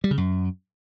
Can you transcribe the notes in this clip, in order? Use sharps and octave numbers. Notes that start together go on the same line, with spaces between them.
G3
C#3
F#2